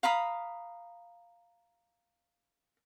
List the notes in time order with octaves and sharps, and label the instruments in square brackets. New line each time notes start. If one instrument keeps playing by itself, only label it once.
[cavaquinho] F5 A#5 B5 D#6